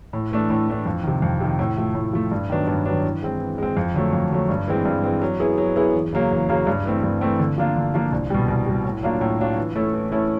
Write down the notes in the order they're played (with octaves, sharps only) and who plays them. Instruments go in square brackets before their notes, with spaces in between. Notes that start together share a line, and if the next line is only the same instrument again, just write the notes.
[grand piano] A2
E3 A3 D4
A2
E3 A3 D4
F2
C3 D#3
F2
C3 D#3
A2
F3 A3
A2
F3 A3
G2
D#3 F#3 B3 D4
G2
D#3 F#3 B3 D4
E3
G#3 C4
E3
G#3 C4
F2
D3 F#3 A3
F2
D3 F#3 A3
G2
E3 G#3 C4
G2
E3 G#3 C4
F#3
B3 E4 G#4
F#3
B3 E4 G#4
E2
C#3 F#3 A#3
E2
C#3 F#3 A#3
G2
E3 A3 C4
G2
E3 A3 C4
D3
F3 A#3 D4 F4
D3
F3 A#3 D4 F4
C2
B2 G3
C2
B2 G3
A2
F#3 A#3 D4 F4
A2
F#3 A#3 D4 F4
E3
A3 C#4 E4 A4
E3
A3 C#4 E4 A4